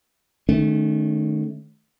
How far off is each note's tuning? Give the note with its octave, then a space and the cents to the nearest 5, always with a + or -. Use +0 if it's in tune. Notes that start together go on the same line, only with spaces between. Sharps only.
D#3 -30 A3 -20 C#4 -10